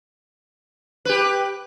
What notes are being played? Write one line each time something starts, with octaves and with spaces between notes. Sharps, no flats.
G4 B4